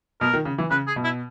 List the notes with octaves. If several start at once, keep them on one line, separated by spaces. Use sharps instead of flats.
B2 A#4
D#3
C#3
E3
C#3 B4
G#4
B2
E4